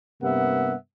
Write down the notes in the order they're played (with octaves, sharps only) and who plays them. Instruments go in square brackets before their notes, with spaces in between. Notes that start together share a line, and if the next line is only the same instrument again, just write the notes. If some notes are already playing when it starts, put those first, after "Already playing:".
[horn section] G2 C3 A#3 B3 E5 F#5